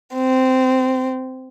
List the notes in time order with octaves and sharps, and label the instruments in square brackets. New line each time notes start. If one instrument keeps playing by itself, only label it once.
[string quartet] C4